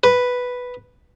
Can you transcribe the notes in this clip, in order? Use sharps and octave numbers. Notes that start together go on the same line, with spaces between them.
B4